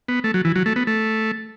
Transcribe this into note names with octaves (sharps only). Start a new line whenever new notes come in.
B3
A3
F#3
E3
F#3
A3
B3
A3